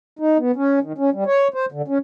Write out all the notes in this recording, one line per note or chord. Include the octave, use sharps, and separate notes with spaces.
D#4
B3
C#4
D#3
C#4
G3
C#5
C5
D3
C#4